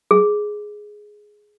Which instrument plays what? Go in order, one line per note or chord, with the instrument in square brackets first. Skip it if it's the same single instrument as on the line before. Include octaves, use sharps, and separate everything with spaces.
[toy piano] G#4